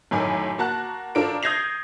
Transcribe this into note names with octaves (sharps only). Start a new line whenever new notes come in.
F#2 A2 D#3 G#5 B5 D6
A#3 F#4 A5 F#6
G#1 D4 F4 A4 A#4 D7
D#6 G6 G#6 A#6 C7 F7